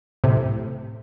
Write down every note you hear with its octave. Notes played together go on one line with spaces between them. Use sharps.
A2 C3